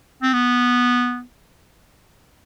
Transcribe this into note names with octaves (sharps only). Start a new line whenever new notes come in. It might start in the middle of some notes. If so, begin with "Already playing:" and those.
C4
B3